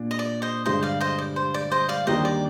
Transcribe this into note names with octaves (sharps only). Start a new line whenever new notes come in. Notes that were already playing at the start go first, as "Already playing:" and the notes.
Already playing: A#2 D4
D#5
D5
C5 D#5
G2 D3 G#3 C5 D#5
D5 F5
C5 D#5
D5
C5
D5
C5 D#5
D5 F5
D#2 D#3 G3 D4 C5 D#5
D5